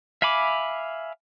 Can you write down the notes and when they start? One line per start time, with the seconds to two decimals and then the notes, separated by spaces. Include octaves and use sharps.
0.22 E5 F5 G#5 B5 D6